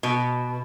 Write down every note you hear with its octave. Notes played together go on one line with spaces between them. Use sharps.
B2